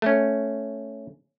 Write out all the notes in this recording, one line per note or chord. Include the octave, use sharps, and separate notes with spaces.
A3 C#4